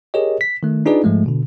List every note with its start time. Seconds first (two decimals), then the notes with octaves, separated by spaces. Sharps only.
0.14 G4 G#4 A#4 C#5 D#5
0.41 B6
0.63 D#3 A3
0.86 D4 D#4 F4 G#4 B4 D5
1.04 G#2 F3 G#3 A3
1.26 B2 D3